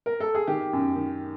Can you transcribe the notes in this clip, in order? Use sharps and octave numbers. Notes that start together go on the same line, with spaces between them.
A#4
A4
G#4
D#3 G4
F#2
D#3